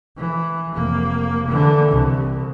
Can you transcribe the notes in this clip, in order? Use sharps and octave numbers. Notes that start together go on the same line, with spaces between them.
E3
F1 A#3
D3 E3
C2